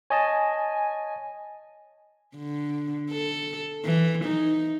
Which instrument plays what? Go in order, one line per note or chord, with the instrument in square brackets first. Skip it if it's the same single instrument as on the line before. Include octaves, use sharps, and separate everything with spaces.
[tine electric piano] C#5 D#5 A5 [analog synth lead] G#5
[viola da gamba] D3
A4
E3
D#4